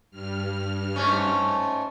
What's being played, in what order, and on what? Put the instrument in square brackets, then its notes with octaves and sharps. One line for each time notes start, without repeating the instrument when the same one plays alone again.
[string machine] G2 F6
[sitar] G#2 A3 C#4